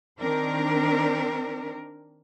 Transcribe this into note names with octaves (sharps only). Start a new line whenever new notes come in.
D#3 C4 D4 A#4